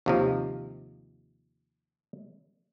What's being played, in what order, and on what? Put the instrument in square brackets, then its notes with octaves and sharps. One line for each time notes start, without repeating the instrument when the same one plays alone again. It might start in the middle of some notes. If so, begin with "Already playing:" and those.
[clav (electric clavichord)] D#2 C3 F3